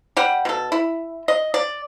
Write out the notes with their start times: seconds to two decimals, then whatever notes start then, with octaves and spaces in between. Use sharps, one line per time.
0.17 G3 G4 F#5
0.45 B2 A4
0.72 E4
1.28 D#5
1.54 D5